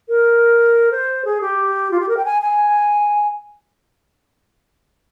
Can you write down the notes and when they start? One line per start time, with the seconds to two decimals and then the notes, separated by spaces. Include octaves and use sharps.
0.09 A#4
0.91 C5
1.25 G#4
1.41 G4
1.91 F4
2.00 G4
2.09 A#4
2.17 G5
2.25 G#5
2.42 G#5